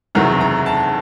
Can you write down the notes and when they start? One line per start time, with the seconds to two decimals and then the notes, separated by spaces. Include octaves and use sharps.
0.15 F#1 E2 C3 D#3 F#3 A#5
0.41 A#5
0.66 A5